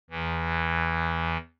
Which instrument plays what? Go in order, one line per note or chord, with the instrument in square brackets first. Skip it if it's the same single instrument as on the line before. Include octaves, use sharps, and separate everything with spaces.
[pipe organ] E2 E3